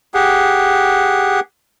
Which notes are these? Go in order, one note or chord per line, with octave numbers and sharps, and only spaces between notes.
G4 G#4 F#5